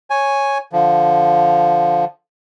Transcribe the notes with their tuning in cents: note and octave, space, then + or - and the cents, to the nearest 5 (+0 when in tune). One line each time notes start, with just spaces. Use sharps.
C#5 -5 G#5 +0
D3 +0 F3 +0